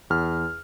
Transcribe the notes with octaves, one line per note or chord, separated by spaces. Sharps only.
E2 F6